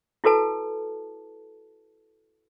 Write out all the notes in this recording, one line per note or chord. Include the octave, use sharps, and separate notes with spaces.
E4 F#4 A4 B4 A5